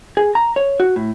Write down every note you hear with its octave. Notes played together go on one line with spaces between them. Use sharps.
G#4
A#5
C#5
F#4
A2